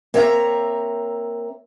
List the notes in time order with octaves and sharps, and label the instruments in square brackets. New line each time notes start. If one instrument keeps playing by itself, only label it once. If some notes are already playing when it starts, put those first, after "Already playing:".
[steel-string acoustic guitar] A#3 C4 C#5 D#5 E5 A#5